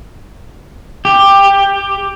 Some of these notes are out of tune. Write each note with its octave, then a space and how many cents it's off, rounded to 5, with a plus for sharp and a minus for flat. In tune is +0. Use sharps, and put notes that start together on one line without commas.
G4 +10